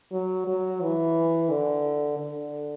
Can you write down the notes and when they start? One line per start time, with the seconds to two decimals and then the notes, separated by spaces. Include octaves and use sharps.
0.12 F#3
0.47 F#3
0.81 E3
1.50 D3
2.19 D3